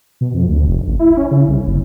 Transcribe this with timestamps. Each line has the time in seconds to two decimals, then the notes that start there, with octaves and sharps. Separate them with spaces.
0.21 B2
0.34 F2
0.48 D2
0.67 F1
0.87 A1
0.99 E4
1.17 C#4
1.31 C#3
1.48 C2
1.66 F#1